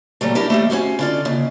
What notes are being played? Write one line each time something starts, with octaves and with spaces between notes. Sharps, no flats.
A#2 F#3 G3 A3
D4 E4 F4 G4 A#4
D#2 G3 A3
C#4 F#4 C5 F5
D3 F4 D5
D#2 C#3